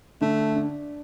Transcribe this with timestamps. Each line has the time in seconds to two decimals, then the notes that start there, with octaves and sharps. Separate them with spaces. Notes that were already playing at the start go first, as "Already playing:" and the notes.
0.21 D3 A3
0.56 D4